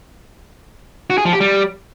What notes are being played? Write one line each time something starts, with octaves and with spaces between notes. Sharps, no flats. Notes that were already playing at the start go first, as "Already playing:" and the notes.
F#4
G#4
F3
G4
G3